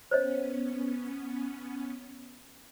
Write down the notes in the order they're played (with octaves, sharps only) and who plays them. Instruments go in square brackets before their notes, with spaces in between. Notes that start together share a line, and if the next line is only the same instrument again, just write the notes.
[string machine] B3 C#4 [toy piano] C5 C#5 D#5